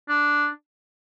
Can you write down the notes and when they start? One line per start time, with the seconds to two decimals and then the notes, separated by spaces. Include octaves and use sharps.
0.09 D4